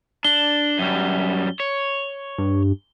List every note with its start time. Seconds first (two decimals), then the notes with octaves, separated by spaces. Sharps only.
0.25 D4 G7
0.79 F#2 G3
1.60 C#5
2.38 G2